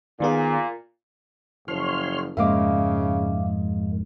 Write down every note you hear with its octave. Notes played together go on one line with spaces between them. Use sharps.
A#2 D#3 B3 G#4
F#1 F3 C#5 C6 F6
F2 G#2 C#3 G#3 A#3 E5 F5 D6